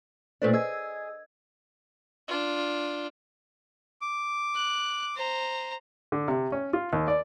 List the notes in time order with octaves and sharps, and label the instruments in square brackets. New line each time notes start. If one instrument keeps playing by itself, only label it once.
[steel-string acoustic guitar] A#2 A3 D4 [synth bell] B4 C5 D5
[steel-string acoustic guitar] G#4 [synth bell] D#5 E6 G#6
[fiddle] D4 F4
[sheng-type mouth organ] D6
[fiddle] F#6
C5 A#5
[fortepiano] D3
C3
C#4
F4
D#2
D5